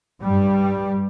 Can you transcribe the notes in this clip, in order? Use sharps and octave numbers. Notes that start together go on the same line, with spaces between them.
G2 G3